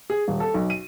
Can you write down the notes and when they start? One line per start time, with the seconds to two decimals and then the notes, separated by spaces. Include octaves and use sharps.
0.10 G#4
0.28 D#1
0.40 A4
0.54 B1
0.70 D#7